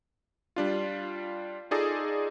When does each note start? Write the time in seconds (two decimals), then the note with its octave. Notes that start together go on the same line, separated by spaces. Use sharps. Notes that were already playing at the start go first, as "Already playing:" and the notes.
0.56 G3 D4 F4
1.71 D#4 F4 G#4 A4 D5 D#5